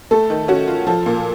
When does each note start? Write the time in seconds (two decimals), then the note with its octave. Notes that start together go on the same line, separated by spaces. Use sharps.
0.11 A3 A4
0.30 D#3
0.48 C#4 F#4
0.68 F4
0.87 F3 A4
1.06 A#2